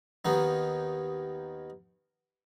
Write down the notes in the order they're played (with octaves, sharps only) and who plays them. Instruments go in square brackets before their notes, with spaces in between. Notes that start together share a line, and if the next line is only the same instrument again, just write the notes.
[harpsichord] D#2 D#3 B3 D#4